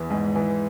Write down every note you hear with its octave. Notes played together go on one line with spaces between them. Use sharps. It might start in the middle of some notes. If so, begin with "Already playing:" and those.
Already playing: E2 E3
G#2
E3